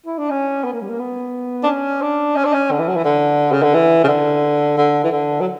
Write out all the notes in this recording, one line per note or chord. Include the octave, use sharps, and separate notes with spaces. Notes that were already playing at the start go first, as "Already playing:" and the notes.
E4
D4
C#4
B3
A#3
G3
A#3
B3
D4
C#4
D4
C#4
D4
C#4
D3
E3
F#3
E3
D3
C#3
D3
E3
C#3
D3
D3
E3
D3
F#3